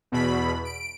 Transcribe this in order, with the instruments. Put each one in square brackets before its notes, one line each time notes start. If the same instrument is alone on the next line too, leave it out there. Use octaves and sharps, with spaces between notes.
[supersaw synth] E2 B2 B5
D7